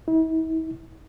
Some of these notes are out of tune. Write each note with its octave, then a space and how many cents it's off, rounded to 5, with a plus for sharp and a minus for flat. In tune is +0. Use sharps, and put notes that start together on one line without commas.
E4 -45